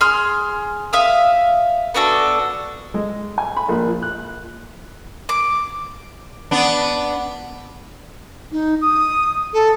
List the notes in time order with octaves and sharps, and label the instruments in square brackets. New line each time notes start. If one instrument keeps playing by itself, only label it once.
[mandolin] G#4 C6 F6
E5 F5 D#6
B3 D4 F#4 A4
[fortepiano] G#3
G#5
B5
A#1
F3
F#6
[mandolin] D6
[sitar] B3 D4
[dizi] D#4
D#6
A4